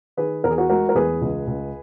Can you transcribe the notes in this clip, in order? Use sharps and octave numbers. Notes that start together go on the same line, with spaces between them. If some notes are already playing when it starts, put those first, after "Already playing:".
D#3 G#4 B4
E2 A#4
G#4
F#4 A#4
G#3 F#4 A#4
A#4
E2 G#4 B4
C#2
C#2